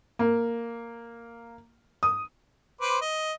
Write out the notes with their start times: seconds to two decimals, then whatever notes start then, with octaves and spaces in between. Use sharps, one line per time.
0.19 A#3
2.03 D#6
2.81 B4 C5 D6
3.02 D#5